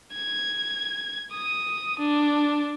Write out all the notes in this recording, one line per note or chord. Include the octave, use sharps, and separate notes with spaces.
G#6
D#6
D4